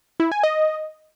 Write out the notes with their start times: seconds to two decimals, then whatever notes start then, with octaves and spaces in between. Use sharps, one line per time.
0.20 E4
0.32 G#5
0.43 D#5